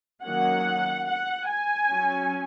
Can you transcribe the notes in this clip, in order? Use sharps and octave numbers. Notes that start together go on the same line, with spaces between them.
D#3 F#3 A#3 C#4 F#5
F#5
G#5
F#3 C#4